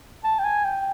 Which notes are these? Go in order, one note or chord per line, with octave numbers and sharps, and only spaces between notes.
A5
G5
G#5
G5